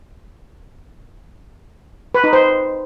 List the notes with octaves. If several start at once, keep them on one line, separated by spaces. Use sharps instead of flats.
B4
D#4
C5